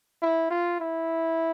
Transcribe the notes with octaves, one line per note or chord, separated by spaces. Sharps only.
E4
F4
E4